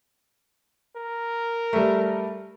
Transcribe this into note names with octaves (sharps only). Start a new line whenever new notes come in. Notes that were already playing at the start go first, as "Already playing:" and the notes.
A#4
G3 A3